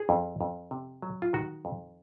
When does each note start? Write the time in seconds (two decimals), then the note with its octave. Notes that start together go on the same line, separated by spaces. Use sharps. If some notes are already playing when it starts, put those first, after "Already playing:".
Already playing: G#4
0.09 F2
0.41 F2
0.71 C3
1.02 F#3
1.22 F4
1.33 D#3 F#4
1.65 F2